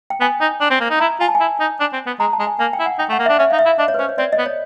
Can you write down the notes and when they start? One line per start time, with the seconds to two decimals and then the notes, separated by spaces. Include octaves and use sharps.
0.10 G5
0.21 B3 G#5
0.41 D#4
0.61 D4
0.71 C4
0.81 A#3
0.91 D#4
1.00 E4 A#5
1.20 F4 G#5
1.28 A5
1.35 G#5
1.41 E4
1.60 D#4
1.80 D4
1.93 C4
2.07 B3
2.20 G#3 A#5
2.33 A5
2.40 G#3
2.47 G#5
2.59 A#3 G#5
2.73 G5
2.80 E4
2.86 F#5
2.99 D#4 G5
3.09 A3
3.13 F#5
3.19 A#3
3.26 D4 E5
3.39 C#4 E5
3.51 D#4 F5
3.59 E5
3.66 E4
3.79 D4 D#5
3.88 C#5
3.94 B4
3.99 C#4 C5
4.09 C#5
4.18 C4 D5
4.33 D#5
4.38 B3
4.46 C#5